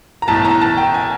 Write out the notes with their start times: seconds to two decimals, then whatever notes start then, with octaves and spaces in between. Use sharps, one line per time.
0.22 A#5
0.28 B1 A2 E3 A5
0.45 A#5
0.61 A5
0.77 G5
0.94 G#5